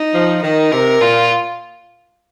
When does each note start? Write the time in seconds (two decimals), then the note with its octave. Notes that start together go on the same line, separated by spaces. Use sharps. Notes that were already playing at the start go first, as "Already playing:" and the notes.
Already playing: D#4
0.14 F3
0.43 D#3 D#4
0.72 C3 A#4
1.01 A#2 F4